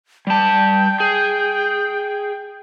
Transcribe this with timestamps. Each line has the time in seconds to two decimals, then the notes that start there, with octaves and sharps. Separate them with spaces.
0.27 G3 G5 A5
1.00 G#4